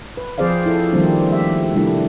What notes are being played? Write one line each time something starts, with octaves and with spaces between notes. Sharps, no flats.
B4
F3 C4 G#4 C5 D5 F5
E4 F4 A4
D#3 F3 G3 A#3 C4 D4
A3 G4 E5
C3 G3 A3 D4 E4